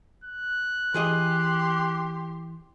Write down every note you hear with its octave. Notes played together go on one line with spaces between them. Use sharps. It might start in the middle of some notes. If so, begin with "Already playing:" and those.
F#6
E3 G4 G#4 D#5 C6